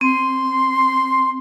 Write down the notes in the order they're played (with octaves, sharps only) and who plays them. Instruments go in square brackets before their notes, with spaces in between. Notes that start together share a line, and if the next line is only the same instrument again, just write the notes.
[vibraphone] C4 [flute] C6